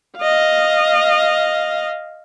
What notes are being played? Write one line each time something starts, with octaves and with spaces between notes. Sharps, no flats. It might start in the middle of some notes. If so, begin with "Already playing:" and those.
D#5 F5